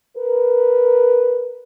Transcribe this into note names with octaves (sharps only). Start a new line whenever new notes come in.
A#4 B4